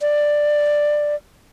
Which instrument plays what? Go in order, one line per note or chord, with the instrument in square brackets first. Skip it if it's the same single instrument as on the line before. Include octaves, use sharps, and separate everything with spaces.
[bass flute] D5